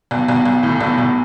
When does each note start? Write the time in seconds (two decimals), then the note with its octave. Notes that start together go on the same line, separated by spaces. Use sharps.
0.11 B1
0.28 B1
0.45 B1
0.63 A2
0.81 B1
0.98 B1